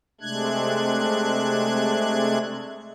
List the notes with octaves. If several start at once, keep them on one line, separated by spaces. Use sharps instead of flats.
C3 G#3 A3 D4 F#6 G#6